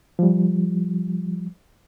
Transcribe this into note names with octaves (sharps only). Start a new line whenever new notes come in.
F3 G3